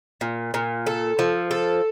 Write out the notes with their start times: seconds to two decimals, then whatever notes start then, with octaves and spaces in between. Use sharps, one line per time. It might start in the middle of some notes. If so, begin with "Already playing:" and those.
0.21 A#2
0.54 A#2
0.87 A4
1.19 F3
1.51 A4